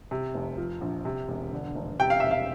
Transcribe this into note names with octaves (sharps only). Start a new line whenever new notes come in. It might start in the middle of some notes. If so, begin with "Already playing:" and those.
C3
F1
F3
A#1
C3
E1
D3
F1
C3 G5
F5
E1 E5
F5